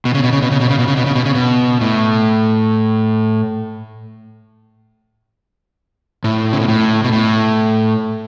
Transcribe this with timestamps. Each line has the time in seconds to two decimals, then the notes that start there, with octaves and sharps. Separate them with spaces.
0.05 B2
0.15 C#3
0.23 B2
0.33 C#3
0.42 B2
0.52 C#3
0.61 B2
0.70 C#3
0.79 B2
0.88 C#3
0.97 B2
1.06 C#3
1.15 B2
1.25 C#3
1.35 B2
1.81 A2
6.24 A2
6.53 C#3
6.61 B2
6.68 A2
7.04 B2
7.13 A2